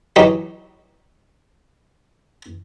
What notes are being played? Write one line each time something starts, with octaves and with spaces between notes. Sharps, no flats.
E3 F#3 D#4 G4